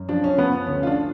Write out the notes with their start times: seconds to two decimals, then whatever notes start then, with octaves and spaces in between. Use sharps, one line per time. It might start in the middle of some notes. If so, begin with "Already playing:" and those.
Already playing: F#2
0.09 F3 D4
0.24 C#4
0.38 F3 B3
0.67 D2 C#4
0.83 F4
0.87 D4